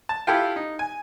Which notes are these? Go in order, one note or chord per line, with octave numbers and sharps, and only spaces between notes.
A5
E4 F4 G4 A4 F5 G5
D#4
G#5